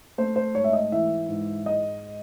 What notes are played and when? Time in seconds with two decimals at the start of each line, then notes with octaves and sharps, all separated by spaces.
0.18 A3 C5
0.36 C5
0.55 G#2 C#5
0.64 E5
0.73 D#5
0.92 E3 E5
1.29 G#2
1.66 G#3 D#5